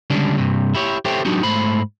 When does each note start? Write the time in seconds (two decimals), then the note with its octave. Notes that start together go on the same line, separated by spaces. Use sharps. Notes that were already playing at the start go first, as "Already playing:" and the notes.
0.10 C#2 D3 G3 C#4 D4
0.38 G2 C3
0.75 E4 G4 C#5
1.05 G4 A4 C5 C#5 E5 G5
1.25 F#3 D4 D#4 F#4 G4
1.43 G#2 A3 C5 B5